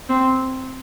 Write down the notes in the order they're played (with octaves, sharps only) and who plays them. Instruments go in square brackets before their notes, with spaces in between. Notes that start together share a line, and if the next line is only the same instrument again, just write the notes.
[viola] C4